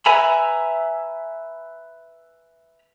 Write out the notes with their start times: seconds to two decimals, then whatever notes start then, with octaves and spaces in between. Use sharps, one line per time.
0.06 B4 E5 G#5 A#5 B5